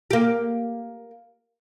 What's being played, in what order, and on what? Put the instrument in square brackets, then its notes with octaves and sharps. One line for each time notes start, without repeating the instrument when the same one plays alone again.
[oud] A#3 G4